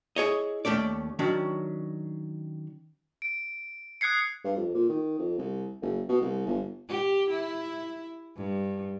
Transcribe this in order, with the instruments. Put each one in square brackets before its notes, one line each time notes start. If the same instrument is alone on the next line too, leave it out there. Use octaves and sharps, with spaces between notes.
[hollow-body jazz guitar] E4 G#4 C#5 D#5
D#2 A3 C#4 D5
D#3 F#3 C#4 D4
[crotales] D7
D#6 F#6 G#6 C7 C#7
[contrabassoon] G2
F2
A#2
D#3
F2
C2
F#1
B2
C2
G1
[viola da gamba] G4
E4
G2